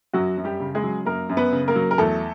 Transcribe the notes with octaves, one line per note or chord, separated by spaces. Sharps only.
F#2 F#3 F#4
F#2
G3 G4
C#3
G#3 G#4
F#3
F#2 A#3 A#4
F#2
B3 B4
C#3
A#3 A#4
F#3
A#4
E2 A3 A4